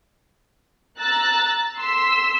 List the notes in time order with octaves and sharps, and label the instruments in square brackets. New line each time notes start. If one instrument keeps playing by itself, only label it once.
[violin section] A#5 E6 F#6 A6
C6 E6 B6